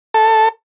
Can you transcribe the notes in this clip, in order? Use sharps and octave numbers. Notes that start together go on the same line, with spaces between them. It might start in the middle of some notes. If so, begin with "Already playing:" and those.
A4